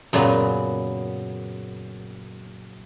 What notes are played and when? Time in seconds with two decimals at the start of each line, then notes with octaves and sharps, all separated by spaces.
0.13 F#2 A#2 C#3 B3